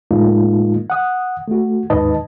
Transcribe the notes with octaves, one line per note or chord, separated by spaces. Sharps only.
A2 G#3 A#3 D#4 F4
F#5 D#6
A3 F#4
D#2 G#2 D#4 B4 D#5 A5